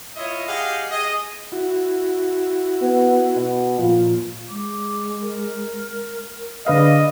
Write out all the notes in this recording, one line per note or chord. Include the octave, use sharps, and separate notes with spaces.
E4 F4 C#5 D#5 E5
G4 G#4 D#5 F5 F#5
G#4 D#5
E4 F#4
B3
B2
A#2 F3 F4
G#3 D6
A#4
D3 G#4 B4 D5 D#5 F5